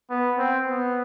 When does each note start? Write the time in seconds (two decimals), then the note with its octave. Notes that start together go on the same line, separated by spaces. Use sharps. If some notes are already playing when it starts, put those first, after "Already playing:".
0.10 B3
0.38 C4
0.68 B3